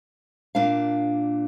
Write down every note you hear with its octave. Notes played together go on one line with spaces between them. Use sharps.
A#2 D4 A#4 F5